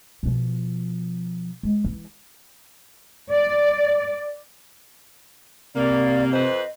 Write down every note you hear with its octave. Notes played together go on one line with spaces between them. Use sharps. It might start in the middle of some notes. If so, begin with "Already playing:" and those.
B2 F3
G#3
E3
D5
C3 A#3 D5
F2 B4 C5 D#5